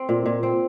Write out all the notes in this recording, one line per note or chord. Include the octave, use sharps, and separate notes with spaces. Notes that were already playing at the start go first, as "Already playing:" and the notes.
Already playing: C4
A#2
A#2
C4